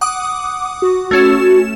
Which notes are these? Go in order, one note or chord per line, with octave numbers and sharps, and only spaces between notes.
F#5 D6 D#6
F#4
A3 C#4 E7